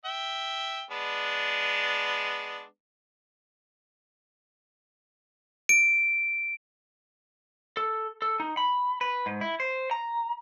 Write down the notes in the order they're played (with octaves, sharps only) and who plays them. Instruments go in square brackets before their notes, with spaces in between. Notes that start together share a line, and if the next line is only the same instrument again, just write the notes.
[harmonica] E5 G5
G#3 B3 D4
[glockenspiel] D7
[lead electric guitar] A4
A4
D#4
B5
B4
G#2
E4
C5
A#5